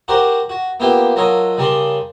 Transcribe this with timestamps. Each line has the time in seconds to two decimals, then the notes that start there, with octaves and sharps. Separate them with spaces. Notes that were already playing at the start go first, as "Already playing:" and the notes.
0.08 F#4 G4 A#4 C5 D5 F#5
0.49 F#4
0.80 A#3 B3 F4 G4 E5 G5
1.16 F#3 F4 A4 A#4 C#5 D#5
1.58 C#3 G3 A#4 D5 A5 C6